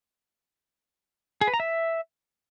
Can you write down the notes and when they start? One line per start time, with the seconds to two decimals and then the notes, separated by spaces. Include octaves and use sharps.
1.41 G#4
1.47 B4
1.54 A#5
1.60 E5